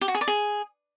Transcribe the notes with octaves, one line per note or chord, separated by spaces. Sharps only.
G4
F#4
G#4
D5
G#4